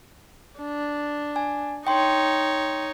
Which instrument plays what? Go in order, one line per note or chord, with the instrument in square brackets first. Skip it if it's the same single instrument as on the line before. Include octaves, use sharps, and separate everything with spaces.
[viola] D4
[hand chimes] G#5
[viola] D#4 C#5 [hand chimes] G5 C6